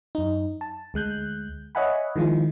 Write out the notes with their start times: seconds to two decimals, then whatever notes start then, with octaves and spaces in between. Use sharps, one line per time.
0.15 F#2 D#4
0.61 A5
0.94 D2 G#3 F#6 G6
1.75 C#5 D#5 E5 F#5 G#5 B5
2.16 D#3 F3 G#3 E4 F4